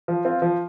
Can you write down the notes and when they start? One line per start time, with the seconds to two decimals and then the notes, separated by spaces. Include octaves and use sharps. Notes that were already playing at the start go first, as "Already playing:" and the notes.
0.08 F3
0.25 C4 F4
0.42 F3